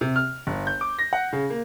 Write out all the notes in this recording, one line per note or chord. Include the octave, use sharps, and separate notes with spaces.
C3
F6
G1
G6
D6
A#6
F#5
C#3
A#3